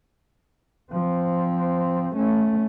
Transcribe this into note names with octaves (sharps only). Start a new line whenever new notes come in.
F3 C4
A3 C#4